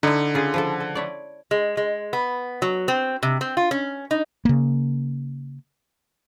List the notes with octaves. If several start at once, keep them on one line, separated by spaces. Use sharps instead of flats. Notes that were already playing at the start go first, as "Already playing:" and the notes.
D3 D#4 E4
C#3 F4 G#4
F3 E4 A4
A4
E4 C#5 D5
G#3
G#3
B3
F#3
C4
C3
C4
F4
C#4
D#4
C#3 A#3